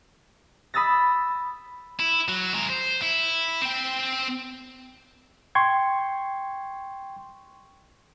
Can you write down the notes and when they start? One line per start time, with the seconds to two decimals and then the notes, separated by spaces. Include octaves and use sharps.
0.74 B5 D#6 E6 A6 A#6
2.00 E4
2.28 F#3
2.54 G#3 A#4
2.69 C5
3.02 E4
3.61 C4 G5
5.55 G5 C6 C#6 G#6